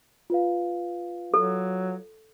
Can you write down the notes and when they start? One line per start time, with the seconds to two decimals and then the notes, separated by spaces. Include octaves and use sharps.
0.30 F4 B4 F5
1.34 F#3 A4